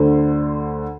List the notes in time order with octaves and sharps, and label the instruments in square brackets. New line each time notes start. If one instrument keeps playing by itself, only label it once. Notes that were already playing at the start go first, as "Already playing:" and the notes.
Already playing: [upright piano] D2 D3 C5